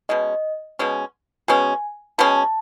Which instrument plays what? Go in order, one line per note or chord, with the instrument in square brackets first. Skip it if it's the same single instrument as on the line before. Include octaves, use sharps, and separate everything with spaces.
[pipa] B2 G#3 C#4 [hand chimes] D#5
[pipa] B2 G#3 C#4
[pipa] B2 G#3 C#4 [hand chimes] G#5
[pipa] B2 G#3 C#4 [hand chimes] A5
[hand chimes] A5